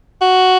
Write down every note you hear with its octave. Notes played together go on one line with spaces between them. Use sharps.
F#4